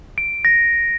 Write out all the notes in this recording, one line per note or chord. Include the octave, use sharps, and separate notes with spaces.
D7
A#6